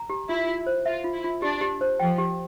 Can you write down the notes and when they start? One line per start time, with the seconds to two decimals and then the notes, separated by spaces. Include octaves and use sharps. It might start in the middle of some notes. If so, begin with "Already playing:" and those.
Already playing: A#5
0.10 G4
0.29 E4 F4
0.47 F4
0.67 C5
0.86 F4 E5
1.04 F4
1.14 E4
1.24 F4
1.42 D4 G4
1.61 G4
1.81 C5
2.00 F3 G5
2.18 G4